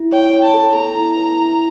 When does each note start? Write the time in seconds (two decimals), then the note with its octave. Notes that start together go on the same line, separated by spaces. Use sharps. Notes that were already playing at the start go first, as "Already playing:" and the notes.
Already playing: E4
0.12 C#5 G5
0.34 C#5
0.44 A5
0.54 A4
0.74 B3 A#5
0.96 E4
1.17 B4
1.37 E4